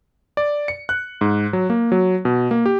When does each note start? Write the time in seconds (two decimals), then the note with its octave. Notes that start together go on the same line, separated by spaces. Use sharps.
0.37 D5
0.68 C#7
0.89 F#6
1.21 G#2
1.53 F#3
1.70 A#3
1.92 F#3
2.25 B2
2.51 A#3
2.66 G4